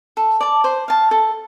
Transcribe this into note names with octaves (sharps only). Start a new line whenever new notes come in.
A4
D5 A5
C5
F5 A5
A4